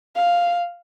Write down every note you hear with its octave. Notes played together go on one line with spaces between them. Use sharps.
F5